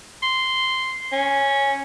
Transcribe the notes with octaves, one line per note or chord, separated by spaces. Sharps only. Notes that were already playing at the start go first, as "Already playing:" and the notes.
C6
C#4